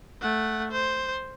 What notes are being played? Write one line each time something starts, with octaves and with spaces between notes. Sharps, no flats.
A3 F#5
C5